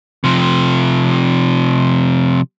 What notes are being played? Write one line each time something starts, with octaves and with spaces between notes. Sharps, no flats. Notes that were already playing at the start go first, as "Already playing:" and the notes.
C3 F3